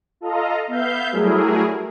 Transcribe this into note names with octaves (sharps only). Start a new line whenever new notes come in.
F4 A4 D#5 F5 A#5
B3 E5 F5 G6
F#3 G3 A3 E4 G#4 A#4